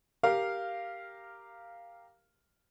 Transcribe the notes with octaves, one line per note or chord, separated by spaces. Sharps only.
G4 A#4 F5